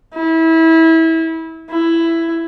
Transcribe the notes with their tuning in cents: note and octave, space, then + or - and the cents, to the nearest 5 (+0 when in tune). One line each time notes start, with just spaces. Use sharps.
E4 -25
E4 +10